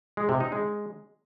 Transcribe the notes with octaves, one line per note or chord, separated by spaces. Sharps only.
G#3
C3
D#4
G#3